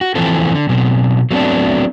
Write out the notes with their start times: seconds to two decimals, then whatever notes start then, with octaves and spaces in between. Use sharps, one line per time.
0.01 F#4
0.15 E3 F3 A#3 C4 A4
0.55 D3
0.69 B2 F#3 C4
1.31 F#3 A3 B3 C4 D4